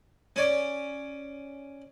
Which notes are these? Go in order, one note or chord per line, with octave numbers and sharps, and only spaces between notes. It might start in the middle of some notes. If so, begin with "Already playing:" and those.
C#4 C#5 D5